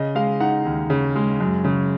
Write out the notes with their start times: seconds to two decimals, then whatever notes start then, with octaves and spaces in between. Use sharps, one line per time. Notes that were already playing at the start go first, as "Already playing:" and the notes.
Already playing: C#3 D#5
0.15 G#3 F5
0.40 D#4 F#5
0.65 D#2
0.90 C#3
1.16 G#3
1.40 F#2
1.64 C#3